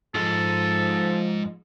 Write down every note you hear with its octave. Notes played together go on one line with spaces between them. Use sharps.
G#2 F3 G#3 A4